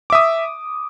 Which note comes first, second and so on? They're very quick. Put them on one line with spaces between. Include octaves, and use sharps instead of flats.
D6 E5 D#6